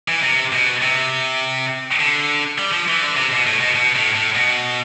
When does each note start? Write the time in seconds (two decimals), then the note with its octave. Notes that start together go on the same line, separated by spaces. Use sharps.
0.08 E3
0.23 C3
0.52 B2
0.82 C3
2.00 D3
2.58 G3
2.73 F3
2.88 E3
3.02 D3
3.17 C3
3.32 B2
3.47 A2
3.61 B2
3.76 B2
3.96 A2
4.15 A2
4.35 B2